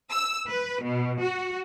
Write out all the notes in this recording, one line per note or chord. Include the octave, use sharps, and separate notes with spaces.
E6
B4
B2
F#4